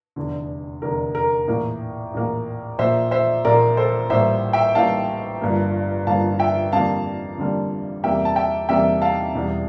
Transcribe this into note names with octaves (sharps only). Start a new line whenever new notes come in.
F1 E2 D3
F1 E2 D3 A#4
A#4
A#1 A2 E3 A#3
A#1 A2 E3 A#3
A#1 A#2 F3 A#3 C5 E5
C5 E5
A#1 A#2 F3 A#3 A#4 D5
A4 C5
A1 A2 G3 A#3 C5 E5
E5 G5
A1 A2 G3 A#3 F5 A5
G1 G2 F3 A#3
G1 G2 F3 A#3 F5 A5
E5 G5
F2 D3 G3 A#3 F5 A5
F2 D3 G3 A#3
E2 C3 E3 G3 A#3 E5 G5
A5
E5 G5
E2 C3 E3 G3 A#3 E5 G5
F5 A5
E1 E2 E3 G3